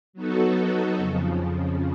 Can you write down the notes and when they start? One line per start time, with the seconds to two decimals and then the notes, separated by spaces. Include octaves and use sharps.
0.13 F#3 B3 D#4 F#4 A4
0.96 F2 C#3 F3